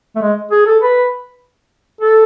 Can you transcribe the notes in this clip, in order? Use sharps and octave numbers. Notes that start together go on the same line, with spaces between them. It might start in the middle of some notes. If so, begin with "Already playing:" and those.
A3
G#3
G#4
A4
B4
A4